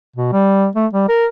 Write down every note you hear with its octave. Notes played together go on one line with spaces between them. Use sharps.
B2
G3
A3
G3
A#4